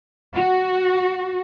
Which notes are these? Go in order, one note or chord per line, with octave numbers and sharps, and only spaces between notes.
F#4